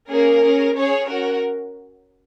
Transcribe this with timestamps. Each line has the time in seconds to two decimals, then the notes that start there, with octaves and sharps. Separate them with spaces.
0.08 A#3 C#4 G#4 A#4
0.41 C#4 G#4
0.74 C#4 G#4 C#5
1.07 C#4 F#4 A#4